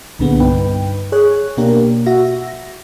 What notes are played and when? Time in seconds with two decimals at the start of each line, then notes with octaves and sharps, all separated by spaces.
0.19 C2 A#2 D3 G#3 B3
0.40 G2 D#4 B4 G5
1.12 G#4 C#5 F#6
1.57 B2 A#3 D4 G4 A#4
2.06 F#4 E5 A#6